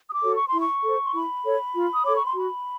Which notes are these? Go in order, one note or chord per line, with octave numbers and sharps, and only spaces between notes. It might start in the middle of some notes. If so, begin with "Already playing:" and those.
D#6
D6
F#4 A4 C#5
C#6
C6
E4
C#6
A4 C5
C6
E4 B5
A4 C#5
F4
D#6
A4 C#5 D6
C#6
C6
F#4 B5